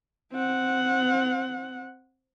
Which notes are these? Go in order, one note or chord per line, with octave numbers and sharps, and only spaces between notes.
C4 F#5